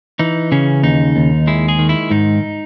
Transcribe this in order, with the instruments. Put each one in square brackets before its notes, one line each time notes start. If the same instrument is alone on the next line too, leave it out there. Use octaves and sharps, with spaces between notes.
[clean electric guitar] E3 D#4
C#3 C#4
D#2 D#4
D#2
G#3 E4
G#4
D#3
E4
G#2 D#4